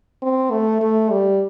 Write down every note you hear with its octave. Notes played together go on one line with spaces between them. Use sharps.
C4
A3
A3
G3